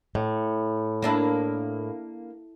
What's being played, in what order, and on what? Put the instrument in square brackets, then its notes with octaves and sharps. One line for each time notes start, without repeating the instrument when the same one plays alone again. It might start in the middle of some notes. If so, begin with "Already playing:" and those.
[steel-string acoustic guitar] A2
[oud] A#3 D4 E4